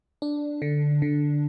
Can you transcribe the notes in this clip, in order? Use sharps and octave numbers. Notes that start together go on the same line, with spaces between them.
D4
D3
D3